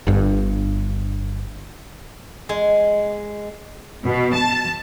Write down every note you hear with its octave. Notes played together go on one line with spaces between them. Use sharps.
G1 G2
G#3
B2
A5